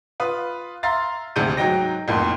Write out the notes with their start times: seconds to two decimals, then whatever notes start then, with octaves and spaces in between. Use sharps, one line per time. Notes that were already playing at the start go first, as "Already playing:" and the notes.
0.20 F4 B4 D#6
0.83 E5 F5 A#5 C6 A6
1.36 D#1 D2 G#2 C3 G6 D#7
1.57 G#2 F#3 D#4 G5 A#6
2.08 B1 F2 A2 A#3 C6